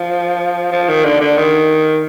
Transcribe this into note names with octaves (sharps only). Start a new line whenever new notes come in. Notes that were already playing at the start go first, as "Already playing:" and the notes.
Already playing: F3
F3
D#3
D3
D3
D#3